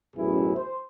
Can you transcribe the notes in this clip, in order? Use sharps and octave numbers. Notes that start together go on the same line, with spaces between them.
A1 F#2 B2 E4 G#4
C5